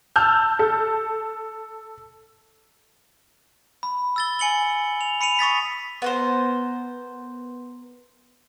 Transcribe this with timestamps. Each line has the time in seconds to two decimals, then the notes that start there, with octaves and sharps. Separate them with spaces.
0.16 A5 E6 F6 G6
0.59 A4
3.83 B5
4.16 E6 A6 G7
4.39 G#5 C#7 F#7 G7
5.01 F7
5.21 B5 C#7 D#7 F7
5.39 C#6 D#6 A6 B6
6.02 B3 A#4 C5